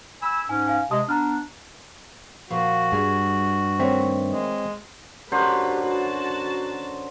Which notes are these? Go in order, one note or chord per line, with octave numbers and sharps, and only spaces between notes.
G#5 B5 E6
G#2 C#4 G#5
F5 G#5
C3 G#3 A5 D#6
B3 D4 A#5 F6
A#2 F3 F#4
G2 G3 G#4
D#3 A3 C4 C#5 E5
G#3
F#2 D3 G4 B4 C5
F#4 A5